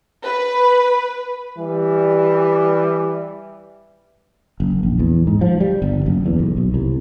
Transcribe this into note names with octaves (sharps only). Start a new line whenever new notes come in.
B4
E3 G3
F#1
A#1
E2
G#2
F3
G3
G1
F#1
E2
B1
B1
C2